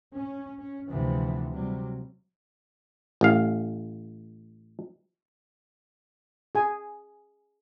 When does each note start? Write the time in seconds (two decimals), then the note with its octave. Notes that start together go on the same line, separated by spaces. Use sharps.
0.15 C#4
0.58 C#4
0.89 D2 C3 E3 F3 B3
1.51 C3 F#3 G3
3.21 A1 F5
6.55 G#4 G#5